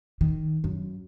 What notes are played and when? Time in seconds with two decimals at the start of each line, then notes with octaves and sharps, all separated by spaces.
0.21 D#3
0.64 F#2